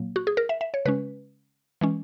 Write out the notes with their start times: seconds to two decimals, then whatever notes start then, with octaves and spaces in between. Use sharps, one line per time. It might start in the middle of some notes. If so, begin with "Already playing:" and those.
Already playing: A#2 F#3 A#3
0.16 F#4
0.27 G#4
0.37 A#4
0.49 E5
0.61 E5
0.74 C#5
0.85 C#3 G#3 C#4 B4
1.81 E3 G#3 C#4